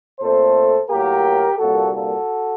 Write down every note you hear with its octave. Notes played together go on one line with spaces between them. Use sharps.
A#2 A3 C4 A4 C5
A2 F#3 A#3 G4 A#4
C2 A#2 G3 A#3 F#4 A4
F#4 A4